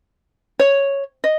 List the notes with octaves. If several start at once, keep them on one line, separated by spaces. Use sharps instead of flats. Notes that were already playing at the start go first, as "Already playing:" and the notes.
C#5
D#5